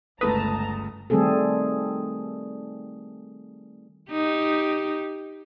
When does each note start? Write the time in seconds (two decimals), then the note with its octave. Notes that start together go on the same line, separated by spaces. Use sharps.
0.21 G1 C#2 A3 B4 A5 A#5 D#6
1.10 D#3 G3 A3 C4 G#4 A4
4.11 D#4 G4